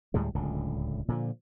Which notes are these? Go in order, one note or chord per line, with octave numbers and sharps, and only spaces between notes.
D2 A2 G3 G#3
D1 C#2 D3
A#2 D3 F3